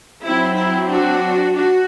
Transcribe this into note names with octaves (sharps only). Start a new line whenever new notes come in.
F#3 C4 E4
E4
D4 F#4
D4 F#4